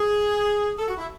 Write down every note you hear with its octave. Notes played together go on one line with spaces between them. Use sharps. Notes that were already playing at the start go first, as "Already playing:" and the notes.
Already playing: G#4
A4
F#4
E4